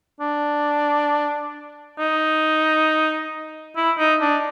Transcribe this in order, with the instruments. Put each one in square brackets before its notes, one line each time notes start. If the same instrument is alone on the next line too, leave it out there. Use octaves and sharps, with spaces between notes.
[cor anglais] D4
D#4
E4
D#4
D4